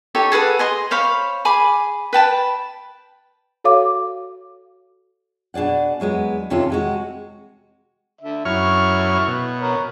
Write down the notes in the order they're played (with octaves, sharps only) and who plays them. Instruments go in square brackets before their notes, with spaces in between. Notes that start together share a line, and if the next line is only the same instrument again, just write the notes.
[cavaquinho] D#4 G4 A4 C#5
G#4 A4 B4 F#5
G#4 D#5 C6
C5 C#5 F5 B5
G#4 G#5 B5 D6
B4 G5 A5 B5
[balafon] F#4 A4 C#5 F5 D6
[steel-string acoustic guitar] B2 D4 G#4 D5 F#5
E2 F#3 G#3 B3
F2 C3 D#3 C#4 F4 A4
C3 G#3 F#4
[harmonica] D3 E5
[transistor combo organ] F#2 C#5 F6 [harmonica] E4 C#6
[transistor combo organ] B2
[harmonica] A#4 C#5